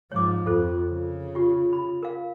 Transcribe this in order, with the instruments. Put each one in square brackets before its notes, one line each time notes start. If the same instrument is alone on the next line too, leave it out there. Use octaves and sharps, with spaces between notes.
[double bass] G#2 F3 [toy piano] C#5 D6
[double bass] F2 [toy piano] F4 A4 C5
[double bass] C#3
[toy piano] F4 G4
B5
A#4 F5